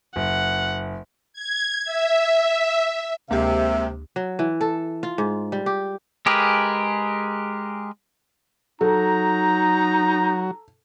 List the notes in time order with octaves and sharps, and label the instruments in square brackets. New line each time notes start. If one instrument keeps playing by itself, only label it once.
[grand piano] F#1 [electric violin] F#5
[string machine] G#6
E5
[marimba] D2 G4 [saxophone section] C3 [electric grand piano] G#3 A#3 [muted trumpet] E5
[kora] F#3
E3
A4
F4
G#2
G3
G4
[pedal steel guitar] G#3 G4 G#4 A#4 B4
[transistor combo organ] F#3 F#4 [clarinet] D#4 [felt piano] A4 [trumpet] A#5